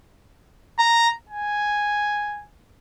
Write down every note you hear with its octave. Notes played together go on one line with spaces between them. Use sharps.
A#5
G#5